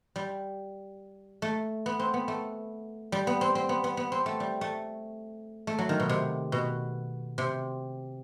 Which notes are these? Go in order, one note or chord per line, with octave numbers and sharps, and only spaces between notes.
G3
A3
B3
C4
B3
A3
G3
B3
C4
C4
B3
B3
B3
C4
A3
G3
A3
A3
F#3
D#3
B2
C3
B2
C3